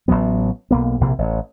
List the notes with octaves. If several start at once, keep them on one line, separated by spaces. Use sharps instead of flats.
A1 D3 F#3 B3
B1 A#3 B3
A#1 C3 A#3
A1